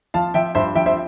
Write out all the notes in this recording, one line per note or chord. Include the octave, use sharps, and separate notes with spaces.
F3 F5 A5
F3 E5 G5
G2 C5 E5
F3 E5 G5
C5 E5